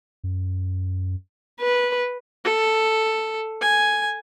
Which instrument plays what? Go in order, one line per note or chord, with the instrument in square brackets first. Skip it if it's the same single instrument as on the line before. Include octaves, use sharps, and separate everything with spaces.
[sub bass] F#2
[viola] B4
[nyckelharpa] A4
G#5